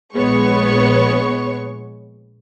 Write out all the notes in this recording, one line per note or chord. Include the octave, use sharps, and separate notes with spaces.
A#1 G#3 B3 C#5 C#6